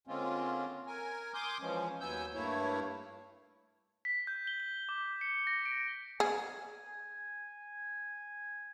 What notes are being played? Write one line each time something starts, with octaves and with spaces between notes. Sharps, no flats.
D3 G#3 A#3 C4 C#4 F4
A#4 G#5
G#5 C6 D6 D#6 G6
E3 F3 G#3 C#4
D#2 F#3 B3 G#5 E6 G6
G2 A3 A#3 E4 C#5
B6
G6
G7
G7
D6
C#7
A#6
D7
G#4 G#5